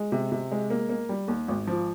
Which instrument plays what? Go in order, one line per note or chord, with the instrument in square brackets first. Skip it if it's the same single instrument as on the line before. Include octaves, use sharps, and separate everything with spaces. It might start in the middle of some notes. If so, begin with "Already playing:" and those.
Already playing: [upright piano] G#3
C3
C3
G#3
A#3
A#3
G3
D#2
G#1
F3